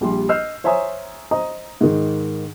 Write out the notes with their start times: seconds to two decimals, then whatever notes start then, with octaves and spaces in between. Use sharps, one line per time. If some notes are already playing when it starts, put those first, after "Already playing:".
0.01 A#1 G3 G4 C6
0.29 D#5 E6 F6 G6 C7
0.64 C5 C#5 E5 G#5 A#5 D#6
1.31 C5 D#5 A#5 D#6
1.81 G#2 D#3